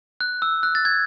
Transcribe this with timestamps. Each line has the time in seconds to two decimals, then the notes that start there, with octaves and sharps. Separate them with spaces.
0.21 F#6
0.42 E6
0.63 F#6
0.75 A6
0.85 G#6